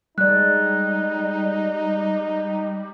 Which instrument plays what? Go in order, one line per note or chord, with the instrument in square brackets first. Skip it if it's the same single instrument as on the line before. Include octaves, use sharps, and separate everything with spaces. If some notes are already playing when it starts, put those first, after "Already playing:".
[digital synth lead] G3 [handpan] G#3 D5 [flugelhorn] D#4 [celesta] F#6